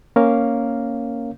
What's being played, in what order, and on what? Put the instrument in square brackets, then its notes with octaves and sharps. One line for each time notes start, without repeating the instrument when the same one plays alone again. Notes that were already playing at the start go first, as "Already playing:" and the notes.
[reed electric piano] A#3 C#4 A#4 C#5 F5